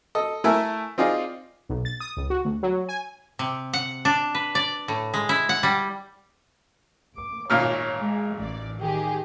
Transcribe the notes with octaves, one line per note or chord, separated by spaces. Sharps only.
A4 D#5
A3 E4 A#4 E5 G#5
C4 D#4 F4 G#4 D5
B1
A6
D#6
C#2
F#4
D2
F#3
G#5
C3
F#5
D4
B4
D5
A2
G#3
E4
F#5
G3
D6
G#1 A#2 C#5 F6
G#3
A1 D5
D#3 G4 G#4